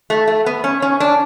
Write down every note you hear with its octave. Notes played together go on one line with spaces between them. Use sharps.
A3
A3
B3
C#4
C#4
D4